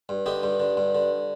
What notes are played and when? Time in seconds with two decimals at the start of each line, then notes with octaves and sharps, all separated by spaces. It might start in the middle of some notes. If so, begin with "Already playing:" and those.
0.09 G2
0.26 D3 D#4 G4
0.43 G2
0.60 D3
0.77 G2
0.95 D3